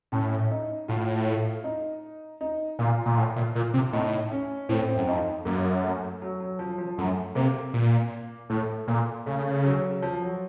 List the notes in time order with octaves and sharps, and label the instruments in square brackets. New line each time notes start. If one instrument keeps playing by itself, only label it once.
[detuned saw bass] A2 [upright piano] C#4
[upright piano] D#4
[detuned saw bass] A2 [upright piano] F4
[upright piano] D#4
D#4
[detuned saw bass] A#2 [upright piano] F4
[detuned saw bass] A#2
A2
A#2
A#2
C3
[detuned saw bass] A2 [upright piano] D#4
[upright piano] C#4
[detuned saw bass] A2 [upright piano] C4
[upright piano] C4
[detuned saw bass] F#2
[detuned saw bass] F2 [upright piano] D#4
[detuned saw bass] F#2 [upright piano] A#3
[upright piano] A3
F#3
F#3
F3
F3
[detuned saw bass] F#2 [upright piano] A3
[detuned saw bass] C3 [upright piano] A#3
[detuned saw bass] A#2
[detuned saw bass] A2 [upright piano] A3
[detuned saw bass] A#2 [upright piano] A#3
[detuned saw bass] C#3 [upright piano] A3
[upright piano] F#3
F3
F#3